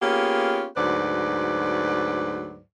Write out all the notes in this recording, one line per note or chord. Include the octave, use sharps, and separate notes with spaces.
A#3 B3 C#4 F4 G4 G#4
D2 G#2 F#3 B4 C5 D5